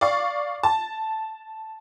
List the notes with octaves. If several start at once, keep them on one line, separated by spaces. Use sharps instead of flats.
D5 F5 C#6
A5